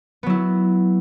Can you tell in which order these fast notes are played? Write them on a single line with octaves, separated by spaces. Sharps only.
B3 F#3 E4